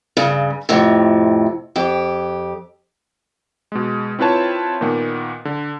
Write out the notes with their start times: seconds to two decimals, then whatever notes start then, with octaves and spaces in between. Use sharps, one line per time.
0.17 G2 C#3
0.69 F2 A2 C3
1.76 F2 G4
3.72 B2 G#3
4.19 C4 E4 F4 B4 C#5 A5
4.81 A#2 D#3 A#3 B3
5.45 D3